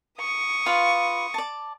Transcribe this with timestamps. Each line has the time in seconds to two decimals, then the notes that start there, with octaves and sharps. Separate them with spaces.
0.18 C#6 D#6
0.66 F4 B4 F5
1.34 D5 A5